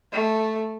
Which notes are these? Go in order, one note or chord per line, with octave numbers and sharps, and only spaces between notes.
A3